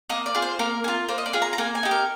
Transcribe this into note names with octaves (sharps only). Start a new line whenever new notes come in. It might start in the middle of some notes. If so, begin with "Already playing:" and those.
A#3 D#5
D5
F4 G#4
C5
A#3 A#4
G#4
F4
A#3 C5
D#5
D5
F4 G#4
A#5
A#5
A#3 G#5
G#5
D#4 G4
A#4